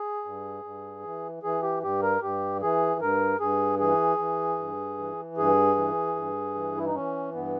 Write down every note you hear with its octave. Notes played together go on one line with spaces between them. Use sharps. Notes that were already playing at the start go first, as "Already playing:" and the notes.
Already playing: G#4
G2
G2
E3
E3 G#4
G4
G2 G4
A#4
G2 G4
E3 G#4
G2 A#4
G2 G#4
E3 G#4
E3
G2
E3
G2 G#4
E3
G2
E3
E4
D#4
E3 C#4
G2 B3